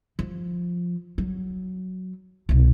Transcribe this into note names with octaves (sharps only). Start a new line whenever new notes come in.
F3
F#3
C2 B2